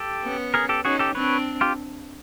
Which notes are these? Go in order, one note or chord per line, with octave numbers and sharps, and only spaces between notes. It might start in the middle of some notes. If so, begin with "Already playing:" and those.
Already playing: G4 A4
B3 C#4
G#4 A#4
G4 A4
C#4 D#4 F#4 G#4
G4 A4
C4 D4 B4 C#5
F4 G4